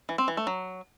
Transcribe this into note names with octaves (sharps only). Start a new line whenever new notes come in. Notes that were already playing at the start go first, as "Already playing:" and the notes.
E3
C4
E3
A3
F#3